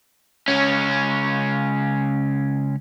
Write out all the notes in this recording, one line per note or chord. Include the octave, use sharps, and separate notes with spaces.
C#2 C#4